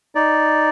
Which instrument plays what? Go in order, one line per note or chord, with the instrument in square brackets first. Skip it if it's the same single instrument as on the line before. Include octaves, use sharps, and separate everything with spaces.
[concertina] D#4 D5